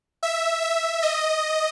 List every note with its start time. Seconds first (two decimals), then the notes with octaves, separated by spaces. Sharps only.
0.23 E5
0.62 E5
1.02 D#5